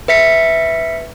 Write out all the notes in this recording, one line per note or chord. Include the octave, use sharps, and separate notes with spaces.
B4 E5 B6 C#7